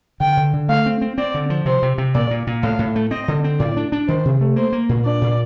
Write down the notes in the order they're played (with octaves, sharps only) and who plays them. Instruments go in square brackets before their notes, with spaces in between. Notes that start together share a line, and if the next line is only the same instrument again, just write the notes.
[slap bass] D3 [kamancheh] G5
[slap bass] D3
D3
[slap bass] A3 [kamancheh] F5
[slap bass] C4
C4
[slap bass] C4 [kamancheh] D5
[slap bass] D3
F3
[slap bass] C3 [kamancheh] C5
[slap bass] C3
C3
[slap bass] A#2 [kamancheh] D5
[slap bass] A#2
A#2
[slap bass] A2 [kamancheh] F5
[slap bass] A2
A3
[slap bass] C4 [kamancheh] D#5
[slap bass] D3
C4
[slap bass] A2 [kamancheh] D5
[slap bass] D4
D4
[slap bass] D#3 [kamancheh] C5
[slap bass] C3
A3
[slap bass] A#3 [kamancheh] C5
[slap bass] A#3
A#2
[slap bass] D4 [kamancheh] D5
[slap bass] A#2